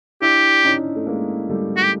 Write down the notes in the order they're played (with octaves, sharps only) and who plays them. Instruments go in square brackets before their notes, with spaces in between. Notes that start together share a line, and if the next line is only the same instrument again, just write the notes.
[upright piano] D4 E4 [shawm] G4
[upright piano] C#4 D#4
A3
G#3 A#3
G3 A3
[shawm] F#4
G4